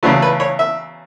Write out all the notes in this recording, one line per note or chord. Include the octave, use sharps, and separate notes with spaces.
E2 C#3 F#3 A3 B3
B4
C#5
E5